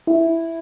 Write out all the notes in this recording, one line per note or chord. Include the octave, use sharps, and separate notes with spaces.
E4